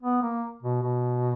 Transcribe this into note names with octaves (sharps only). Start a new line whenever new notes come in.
B3
A#3
B2
B2